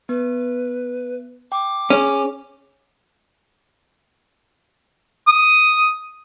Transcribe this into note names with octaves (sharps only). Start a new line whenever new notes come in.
B3 B4
G5 D6
C#4 G#4
D#6